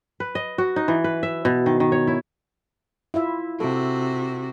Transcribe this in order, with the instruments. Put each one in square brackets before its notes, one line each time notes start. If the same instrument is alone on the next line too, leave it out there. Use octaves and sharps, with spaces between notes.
[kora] B4
D#5
F#4
D#4
E3
B4
E5
B2
D#3
D#3
C#5
E4
[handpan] E4 F4 E5
[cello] C3 F#4 [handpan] A4